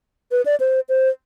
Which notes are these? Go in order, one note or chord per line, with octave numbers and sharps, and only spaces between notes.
B4
D5
C5
C5